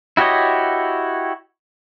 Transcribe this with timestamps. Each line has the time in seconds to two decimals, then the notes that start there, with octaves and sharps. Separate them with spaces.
0.17 E4 F#4 G4 C#5 D#5